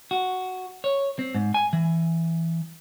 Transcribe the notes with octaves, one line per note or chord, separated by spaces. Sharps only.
F#4
C#5
C4
G#2
G#5
E3